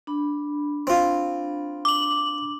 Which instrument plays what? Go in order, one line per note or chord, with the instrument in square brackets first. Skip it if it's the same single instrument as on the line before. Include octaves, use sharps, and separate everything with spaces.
[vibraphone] D4 B5
[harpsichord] C4 F4
[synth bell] D6 F#7